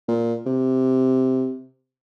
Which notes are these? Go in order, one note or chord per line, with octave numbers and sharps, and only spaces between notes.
A#2
C3